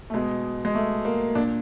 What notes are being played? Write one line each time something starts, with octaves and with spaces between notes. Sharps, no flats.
A3
B2 G#3
G#3
A3
A#3
A#2 D4